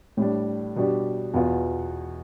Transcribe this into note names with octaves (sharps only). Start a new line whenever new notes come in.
A2 G3 D4
B2 G3 D4 G4
E2 B2 B3 F4